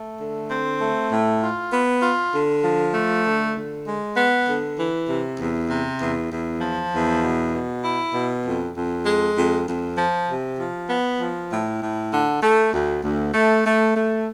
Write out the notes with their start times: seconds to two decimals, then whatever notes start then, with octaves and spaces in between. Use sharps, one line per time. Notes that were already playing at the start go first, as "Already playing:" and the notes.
Already playing: A3
0.19 D3
0.50 C4
0.80 A3
1.10 A2
1.42 F4
1.72 B3
2.02 F4
2.33 D3
2.64 F3
2.94 A3
3.25 D3
3.56 D3
3.86 G#3
4.16 B3
4.47 D3
4.78 E3
5.08 C3
5.39 E2
5.70 C3
6.00 E2
6.31 E2
6.61 F3
6.92 E2
7.22 B2
7.53 B2
7.83 E4
8.14 B2
8.45 F2
8.75 F2
9.06 G#3
9.37 F2
9.67 F2
9.97 F3
10.29 C3
10.59 F3
10.89 B3
11.20 F3
11.51 A2
11.81 A2
12.12 D3
12.43 A3
12.73 D2
13.03 D2
13.34 A3
13.65 A3
13.96 A3